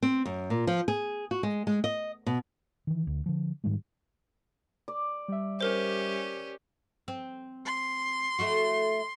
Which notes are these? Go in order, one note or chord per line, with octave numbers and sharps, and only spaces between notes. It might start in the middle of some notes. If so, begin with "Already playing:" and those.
C4
F#2
A#2
F3
G#4
F#4
G#3
G#3
D#5
B2
D#3 E3
D2
D3 F3
G#2 D#3 G3 G#3
D5
G3 E5
C#4 G4 A#4 C5
C4
C6
A3 E4 F#4